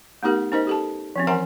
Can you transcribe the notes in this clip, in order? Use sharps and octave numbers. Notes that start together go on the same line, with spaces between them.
A3 B3 D#4 G4 A#4
C#4 D#4 A#4 C5 D#5
G4 A4 A5
F3 C4 C#4
E3 A#4 E5 F#5 G#5 A#5